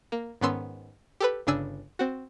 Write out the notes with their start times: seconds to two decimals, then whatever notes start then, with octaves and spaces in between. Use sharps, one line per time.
0.12 A#3
0.41 G#2 D#3 B3 C#4 C6 E6
1.20 G4 A4 B4
1.47 G1 C#3 D4 G#5 E6
1.99 C4 F#4